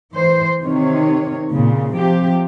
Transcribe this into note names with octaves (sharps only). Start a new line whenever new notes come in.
E3 C5
C3 D#3 C#5
A#2 C#3
C3 F3 G4